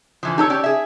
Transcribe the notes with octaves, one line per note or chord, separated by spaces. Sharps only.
D3 E3 F3
D#4 G4 A4 C#5 A5 E6
C#4 G4 D5
G#4 E5